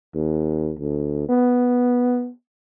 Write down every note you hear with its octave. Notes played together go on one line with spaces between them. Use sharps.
D#2
D2
B3